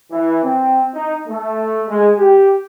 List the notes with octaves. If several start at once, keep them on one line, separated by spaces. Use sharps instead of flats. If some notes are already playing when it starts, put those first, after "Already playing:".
E3
C4
D#4
A3
G#3
G4